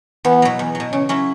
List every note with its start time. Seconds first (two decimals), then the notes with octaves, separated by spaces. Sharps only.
0.25 E2 B3
0.42 B2 F#3
0.59 E2
0.75 F#3
0.80 B2
0.92 C#3 C#4
1.09 F#3 C#4 E4